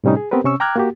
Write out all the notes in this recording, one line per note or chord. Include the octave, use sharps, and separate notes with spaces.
A2 C3 G3 C#4 D#4
G#4
B3 C4 G4 A#4 B4
C3 C#4 C#6 E6
G5 A#5 D6 F6 F#6 G#6
A#3 F#4 G4